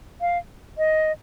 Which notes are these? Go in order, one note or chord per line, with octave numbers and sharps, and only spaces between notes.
F5
D#5